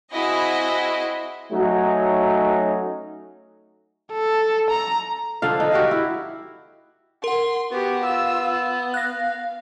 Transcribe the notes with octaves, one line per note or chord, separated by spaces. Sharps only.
C4 E4 F#4 G#4 D#5
F#3 A3 C#4 D#4
A4
A#5
D3 F3 D4 F5
D#4
F#4 G4 E5 F5
E4
A#4 F#5 C6
B3 F#4 G4
F4 E6
F5 F#6 A#6